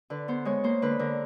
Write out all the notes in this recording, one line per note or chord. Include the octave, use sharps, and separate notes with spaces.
D3 B4
B3 C5
G#3 C#5
A#3 C5
D3 B4
D3 A#4